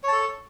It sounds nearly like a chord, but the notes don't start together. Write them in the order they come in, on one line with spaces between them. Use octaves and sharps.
C#5 A5 A4